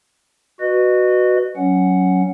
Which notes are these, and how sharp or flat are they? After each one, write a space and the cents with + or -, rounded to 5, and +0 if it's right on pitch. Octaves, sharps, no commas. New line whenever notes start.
F#4 +0 B4 +0 D#5 -30
F#3 +0 C#4 +0 F#5 +0